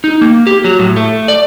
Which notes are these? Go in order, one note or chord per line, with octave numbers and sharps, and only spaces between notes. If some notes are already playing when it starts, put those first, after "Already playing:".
D#4
A#3
G4
F#3
A2
A3
D5